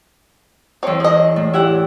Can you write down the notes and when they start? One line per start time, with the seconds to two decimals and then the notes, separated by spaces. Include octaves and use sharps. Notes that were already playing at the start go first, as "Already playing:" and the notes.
0.83 E2 C4 C#5
1.00 G#4 D#5
1.36 A2
1.54 E4 G4 F#5